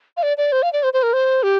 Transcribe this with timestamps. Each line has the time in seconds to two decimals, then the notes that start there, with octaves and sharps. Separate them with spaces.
0.17 F5
0.23 D5
0.38 D5
0.52 C5
0.63 F5
0.73 D5
0.83 C5
0.93 C5
1.03 A#4
1.13 C5
1.43 G4